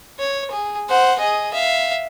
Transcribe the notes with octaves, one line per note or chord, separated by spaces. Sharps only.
C#5
G#4
C5 F#5
G#4 D#5
E5 F5